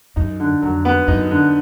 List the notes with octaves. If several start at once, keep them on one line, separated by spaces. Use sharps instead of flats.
F#2 D#4
D3
F2 F#3
B3
F#2 D#4
D3